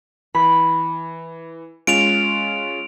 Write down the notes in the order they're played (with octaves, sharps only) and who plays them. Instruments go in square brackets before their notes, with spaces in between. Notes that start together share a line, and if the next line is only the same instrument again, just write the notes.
[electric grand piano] E3 [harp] B5
[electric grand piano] G#3 C#4 F4 [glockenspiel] D7 F7